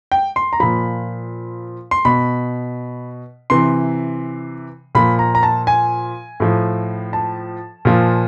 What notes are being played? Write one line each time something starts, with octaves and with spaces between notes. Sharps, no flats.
G5
C6
A#5
A#2 F3 B5
C6
B2 B5
C3 E3 C6
A#2 F3 B5
A#5
A#5
A5
G#5
A2 F3
A5
A#2 F3